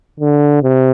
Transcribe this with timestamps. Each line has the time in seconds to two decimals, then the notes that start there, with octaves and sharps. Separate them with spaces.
0.20 D3
0.63 C3